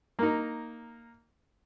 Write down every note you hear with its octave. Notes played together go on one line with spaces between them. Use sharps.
A#3 D#4